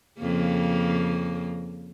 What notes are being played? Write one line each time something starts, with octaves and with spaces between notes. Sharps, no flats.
F2 C#3 A#3